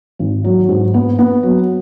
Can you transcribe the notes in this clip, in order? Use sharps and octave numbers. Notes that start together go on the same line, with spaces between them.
G#1
F#3
G#2
B3
B3
F#3